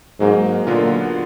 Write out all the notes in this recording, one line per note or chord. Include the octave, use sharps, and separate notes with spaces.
G#2 F#3 A#3 D#4
A#2 D3 F#3 B3 F4 A#4